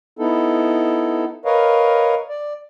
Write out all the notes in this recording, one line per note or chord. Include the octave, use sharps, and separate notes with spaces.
B3 D#4 E4 A4
A#4 B4 C#5 D#5 F5
D5